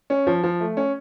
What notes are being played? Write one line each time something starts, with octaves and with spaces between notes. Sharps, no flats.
C#4
F3
F3
A3
C#4